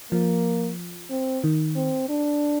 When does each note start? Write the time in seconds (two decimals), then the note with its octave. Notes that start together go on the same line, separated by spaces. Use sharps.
0.12 F3 A#3
1.10 C4
1.44 D#3
1.76 C4
2.09 D4